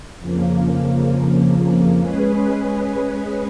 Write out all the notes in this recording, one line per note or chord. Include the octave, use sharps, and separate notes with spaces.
F2 C#3 F3 A#3
G#3 C#4 G#4 B4